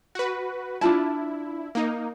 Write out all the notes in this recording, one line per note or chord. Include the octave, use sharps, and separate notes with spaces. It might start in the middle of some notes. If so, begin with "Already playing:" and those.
F#4 B4
D4 E4 F4 A5
A#3 D#4